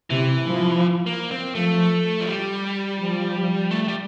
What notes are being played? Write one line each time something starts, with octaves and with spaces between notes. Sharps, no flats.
C3 E3
F3
A#3
C4
F3 A3
F3
G3
F3
A3
G3